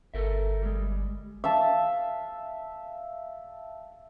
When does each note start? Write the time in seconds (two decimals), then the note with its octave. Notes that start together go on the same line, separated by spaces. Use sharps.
0.14 G1 A4 A#4 E5
0.62 G3 G#3
1.44 E5 F5 A5